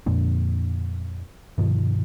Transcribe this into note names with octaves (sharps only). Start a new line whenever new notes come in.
F2 A#2 D3
G2 B2 D#3 F3